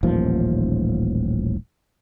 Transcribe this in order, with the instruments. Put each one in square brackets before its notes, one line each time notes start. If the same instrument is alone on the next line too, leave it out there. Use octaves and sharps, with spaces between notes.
[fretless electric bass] D#1 A1 D#2 F3